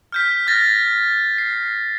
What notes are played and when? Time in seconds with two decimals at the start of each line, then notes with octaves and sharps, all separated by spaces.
0.12 F6 G6 B6
0.47 F6 G6 A6 A#6
1.38 C7